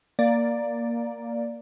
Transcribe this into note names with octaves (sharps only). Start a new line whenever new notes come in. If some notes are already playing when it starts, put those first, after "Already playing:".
A#3 D5